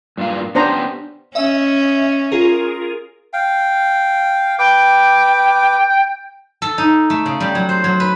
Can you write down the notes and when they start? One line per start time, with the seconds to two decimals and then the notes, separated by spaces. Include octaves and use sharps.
0.18 G2 A#2 F5
0.55 B3 C#4 D4 G4 C5 A#5
1.35 C#4 D#5 E5
2.32 F4 G#4 A#4
3.33 F5 G5
4.59 B4 G5 D6
6.62 A4
6.78 D#4
7.10 A3
7.26 C#3
7.40 G3
7.55 F#3
7.69 C5
7.84 F#3
8.00 B4